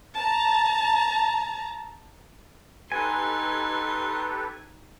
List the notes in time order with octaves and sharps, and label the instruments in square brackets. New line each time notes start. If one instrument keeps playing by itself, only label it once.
[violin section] A5 A#5
[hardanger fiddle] D#4 C6 [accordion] G4 A4 B4 [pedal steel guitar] G#5